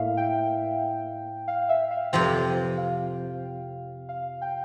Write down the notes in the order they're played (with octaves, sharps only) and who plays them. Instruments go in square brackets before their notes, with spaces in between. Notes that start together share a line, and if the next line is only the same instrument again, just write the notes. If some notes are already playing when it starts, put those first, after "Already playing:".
Already playing: [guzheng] A2 A#3 [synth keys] E5 F5
[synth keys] G5
F5
E5
F5
[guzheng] F2 C3 F3 C4 [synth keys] G5
[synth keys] F5
F5
G5